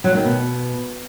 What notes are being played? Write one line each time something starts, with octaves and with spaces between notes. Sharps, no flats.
F#3
D#3
B2